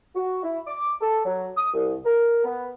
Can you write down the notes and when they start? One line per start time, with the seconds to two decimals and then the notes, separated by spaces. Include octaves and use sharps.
0.15 F#4
0.43 E4
0.67 D6
1.01 A4
1.25 F#3
1.57 D#6
1.74 C2
2.05 A#4
2.44 B3